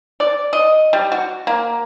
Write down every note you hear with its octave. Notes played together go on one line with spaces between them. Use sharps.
D5
D#5
G3
F#4
A#3